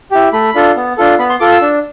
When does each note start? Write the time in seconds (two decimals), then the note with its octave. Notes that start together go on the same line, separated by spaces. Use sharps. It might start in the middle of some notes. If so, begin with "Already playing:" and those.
0.11 E4 G4
0.33 A3 B5
0.55 D4 F4 A4
0.76 B3
0.97 D4 F4 A4
1.18 B3 B5
1.29 C6
1.40 F4 A4 D6
1.52 E6
1.62 D4